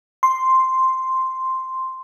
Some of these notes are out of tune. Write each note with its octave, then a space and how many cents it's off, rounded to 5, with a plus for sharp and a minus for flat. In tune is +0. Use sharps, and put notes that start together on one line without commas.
C6 +0